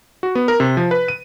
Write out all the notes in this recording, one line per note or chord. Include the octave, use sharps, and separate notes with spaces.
F#4
B3
A#4
C3
F3
B4
D#7